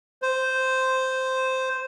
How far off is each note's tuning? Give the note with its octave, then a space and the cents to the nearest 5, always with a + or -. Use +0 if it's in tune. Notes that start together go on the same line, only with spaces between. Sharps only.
C5 -5